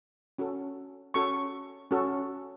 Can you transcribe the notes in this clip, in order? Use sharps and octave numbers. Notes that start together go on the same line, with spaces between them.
C#4 F#4 A4
C#4 F#4 A4 C#6
C#4 F#4 A4